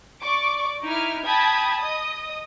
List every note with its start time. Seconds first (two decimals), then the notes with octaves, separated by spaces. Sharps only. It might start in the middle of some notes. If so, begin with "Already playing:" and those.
0.22 D5 C#6 D6
0.82 D#4 E4 D6 F6
1.23 G5 A5 B5 D#6 G#6
1.77 D#5 D#6